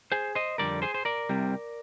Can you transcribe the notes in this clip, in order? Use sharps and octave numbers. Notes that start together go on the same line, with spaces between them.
G#4 C5
C5 D#5
F2 D3 G3 A#4 D5
G#4 C5
C5
A#4 D5
C2 C3 G3